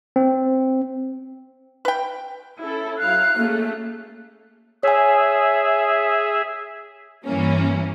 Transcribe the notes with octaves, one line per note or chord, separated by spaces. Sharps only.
C4
B4 G5
C#4 E4 A4
F#3 E4 F5 F#6
A3 A#3 C#4 G#4
G#4 C#5 E5 G#5
G2 E3 A#3 C#4